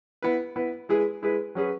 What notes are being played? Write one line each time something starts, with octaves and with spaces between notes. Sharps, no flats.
B3 E4 B4
B3 E4 B4
G#3 E4 G#4 B4
G#3 E4 G#4 B4
F#3 C#4 G#4 B4